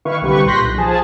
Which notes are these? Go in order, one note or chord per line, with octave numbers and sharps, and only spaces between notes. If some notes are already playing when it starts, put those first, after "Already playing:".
D#3 E4 B4 F5 C#6
C2 D3 G3 G4 B4 C#6
A#1 C6 F#6 G6 A#6 B6
B1
F3 G#4 A5